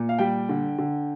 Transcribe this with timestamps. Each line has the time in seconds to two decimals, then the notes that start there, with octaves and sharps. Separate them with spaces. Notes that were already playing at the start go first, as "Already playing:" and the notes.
Already playing: A#2
0.09 F5
0.19 G3 G5
0.49 D3
0.78 D3